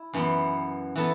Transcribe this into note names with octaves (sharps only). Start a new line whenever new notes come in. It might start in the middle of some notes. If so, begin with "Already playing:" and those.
Already playing: E4
F#2 E3 B3
E3 B3 A4